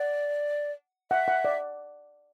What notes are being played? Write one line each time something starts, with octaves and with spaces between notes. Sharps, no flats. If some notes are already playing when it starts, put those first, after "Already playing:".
Already playing: D5 F#5
E5 F#5
F#5
D5